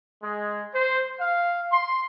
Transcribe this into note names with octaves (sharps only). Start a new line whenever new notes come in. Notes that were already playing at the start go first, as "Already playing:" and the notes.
G#3
C5
F5
C6